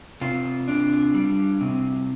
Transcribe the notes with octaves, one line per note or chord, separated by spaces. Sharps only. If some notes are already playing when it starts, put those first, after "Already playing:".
C3 F4
D4
G3
C3